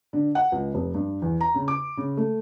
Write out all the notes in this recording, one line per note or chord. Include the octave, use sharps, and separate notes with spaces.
D3
F#5
C#2
F1
G2
E2
A#5
C#3
D6
C#3
A3